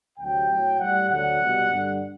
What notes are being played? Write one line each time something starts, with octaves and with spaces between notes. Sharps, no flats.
D2 C3 F#3 G5
A2 F#3
A2 G3 F#5
D2 D3 F#3 F#5
C2 B2 G3
G2 D3 G3